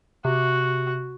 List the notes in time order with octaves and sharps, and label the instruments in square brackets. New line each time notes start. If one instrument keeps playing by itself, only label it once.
[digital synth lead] C3 [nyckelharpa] F#4